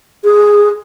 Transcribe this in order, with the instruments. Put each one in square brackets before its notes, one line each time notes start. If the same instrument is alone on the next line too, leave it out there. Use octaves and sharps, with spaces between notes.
[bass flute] G#4